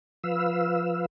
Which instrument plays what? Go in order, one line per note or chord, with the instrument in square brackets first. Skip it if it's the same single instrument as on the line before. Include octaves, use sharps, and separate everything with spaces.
[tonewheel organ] F3 B4 F5 E6